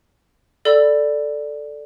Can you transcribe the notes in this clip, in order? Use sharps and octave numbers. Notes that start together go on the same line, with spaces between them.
A4 D5 B5 E6